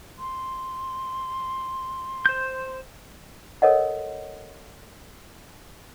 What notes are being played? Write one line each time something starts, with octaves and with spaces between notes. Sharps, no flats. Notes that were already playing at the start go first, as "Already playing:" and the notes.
C6
C5 G6
A4 A#4 C#5 D#5 F#5